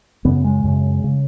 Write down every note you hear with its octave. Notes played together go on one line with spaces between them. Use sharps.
F#2 C#3 B3
G#3
F#2 C#3
C#3